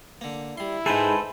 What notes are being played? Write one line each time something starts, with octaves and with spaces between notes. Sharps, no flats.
D3 A#3
G3 E4 C6
G#2 D#4 G#4 A4 B4 C5 G5 G#5